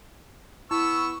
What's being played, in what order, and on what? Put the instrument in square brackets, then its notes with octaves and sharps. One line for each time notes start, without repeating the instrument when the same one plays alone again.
[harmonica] B3 C#6 E6 [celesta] E4